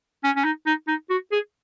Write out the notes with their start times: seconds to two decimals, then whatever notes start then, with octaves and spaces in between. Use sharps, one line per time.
0.24 C#4
0.36 C#4
0.45 D#4
0.67 D#4
0.88 D#4
1.10 F#4
1.32 G#4